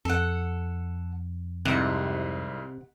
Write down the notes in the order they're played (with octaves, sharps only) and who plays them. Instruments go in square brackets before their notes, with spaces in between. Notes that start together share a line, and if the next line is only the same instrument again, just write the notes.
[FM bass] F2 [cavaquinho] A4 F#5
[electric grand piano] C2 G#2 E4 [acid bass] C3 [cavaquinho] F#5